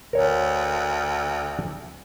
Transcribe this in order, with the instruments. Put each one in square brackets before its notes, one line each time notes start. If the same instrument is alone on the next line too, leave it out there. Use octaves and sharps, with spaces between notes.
[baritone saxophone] D2 [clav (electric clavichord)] A#4 C#5